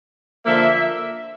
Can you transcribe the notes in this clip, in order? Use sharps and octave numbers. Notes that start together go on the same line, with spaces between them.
D3 F3 A#3 E5